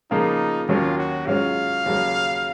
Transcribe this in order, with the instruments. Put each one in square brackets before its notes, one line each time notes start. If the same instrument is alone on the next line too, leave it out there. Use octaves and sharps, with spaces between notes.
[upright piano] C#3 F3 A#3 F4 [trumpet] D#4
[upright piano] D#2 D#3 F#3 C#4 [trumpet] F4
[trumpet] F#4
[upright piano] G#2 F#3 C#4 F4 [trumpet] F5
[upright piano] D#2 C#3 F#3